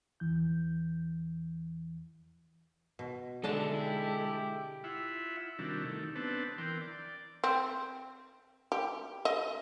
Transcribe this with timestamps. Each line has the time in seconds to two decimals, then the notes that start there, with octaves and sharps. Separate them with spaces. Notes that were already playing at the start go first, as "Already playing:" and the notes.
0.20 E2 E3 G6
2.99 B2
3.44 D3 G#3 D4 D#4 A4 E5 A5
3.74 E4 G4
4.84 E4 F4 E5 F#5
5.59 C3 D#3 G3 D4 E4 F#4
5.83 D#3 A3
6.15 B3 C4 D4 B4 A5
6.58 E3 A#4 G5 C6
6.81 D5
7.44 C4
8.72 G4
9.25 D#5